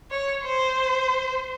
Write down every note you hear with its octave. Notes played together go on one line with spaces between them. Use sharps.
C#5
C5